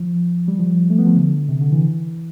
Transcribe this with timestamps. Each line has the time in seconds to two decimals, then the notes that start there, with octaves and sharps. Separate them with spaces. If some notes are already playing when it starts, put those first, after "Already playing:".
Already playing: F3
0.48 G3
0.59 F3
0.90 A3
0.99 B3
1.07 F3
1.16 D3
1.49 C3
1.61 D3
1.72 E3